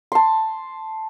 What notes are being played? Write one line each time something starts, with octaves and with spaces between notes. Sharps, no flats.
A5 C6